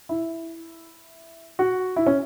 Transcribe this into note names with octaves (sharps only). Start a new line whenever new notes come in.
E4
F#4
E4
C#4